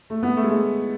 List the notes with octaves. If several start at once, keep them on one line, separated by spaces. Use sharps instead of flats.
A3
B3
A3
G#3
A3